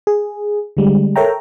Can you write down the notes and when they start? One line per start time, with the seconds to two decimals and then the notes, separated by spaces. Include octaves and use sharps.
0.07 G#4
0.77 D3 G3 G#3
1.16 A4 A#4 C#5 E5 G5 A#5